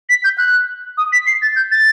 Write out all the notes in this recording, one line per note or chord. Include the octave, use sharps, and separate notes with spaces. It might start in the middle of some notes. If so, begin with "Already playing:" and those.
B6
G6
F#6
D#6
B6
C7
A6
G6
A6